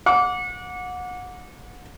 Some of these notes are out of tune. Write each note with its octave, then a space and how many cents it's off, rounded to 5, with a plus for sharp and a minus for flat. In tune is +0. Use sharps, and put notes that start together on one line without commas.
F#5 -30 D6 -20